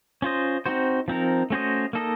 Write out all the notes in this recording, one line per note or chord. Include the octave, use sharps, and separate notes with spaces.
C#4 F4 C5 D#5
C4 D#4 F#4 C5
F3 C4 D#4 A#4
A3 C#4 F#4 C5 D#5
A#3 D#4 A4 D#5